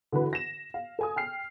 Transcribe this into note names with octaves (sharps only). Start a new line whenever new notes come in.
D3 E3 F#4 B4
A#6 E7
F5
A4 G#5 D#6
G5 F6 C7